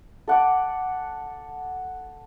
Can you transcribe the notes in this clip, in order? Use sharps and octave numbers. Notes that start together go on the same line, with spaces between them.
A4 F#5 D6